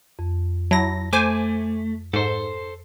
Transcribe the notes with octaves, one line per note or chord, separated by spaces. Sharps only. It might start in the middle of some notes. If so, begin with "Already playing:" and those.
F2
F#3 E4 A5 A#6
A3 C5 G#5 D6
G#2 A4 C5